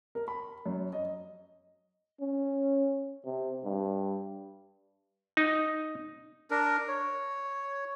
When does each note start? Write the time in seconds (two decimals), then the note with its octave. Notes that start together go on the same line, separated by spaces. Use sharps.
0.15 A#4
0.28 B5
0.66 F#2
0.93 D#5
2.20 C#4
3.25 C3
3.64 G2
5.37 D#4
6.51 D4 A#4
6.88 C#5